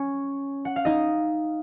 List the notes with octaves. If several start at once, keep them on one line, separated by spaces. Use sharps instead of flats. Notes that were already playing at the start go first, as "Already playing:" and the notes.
Already playing: C#4 C#5
F#5
F5
D#4 D#5